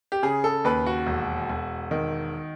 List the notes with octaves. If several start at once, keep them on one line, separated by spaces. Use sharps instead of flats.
G4
C#3 G#4
A4
D#2 B4
F#4
E1
E1
D#3